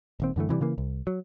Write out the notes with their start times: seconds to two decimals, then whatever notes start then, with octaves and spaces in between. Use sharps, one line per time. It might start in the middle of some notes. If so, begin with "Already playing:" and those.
0.20 D#1 D#2 C4
0.36 F#2 D3 E3 A3
0.49 C3 E3 F#3 G3
0.61 C#3 E3 A#3
0.78 C2
1.07 F#3